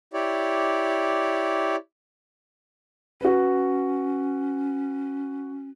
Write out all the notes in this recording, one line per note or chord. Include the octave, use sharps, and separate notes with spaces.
E4 G4 C#5 D5
C#4 F#4 B4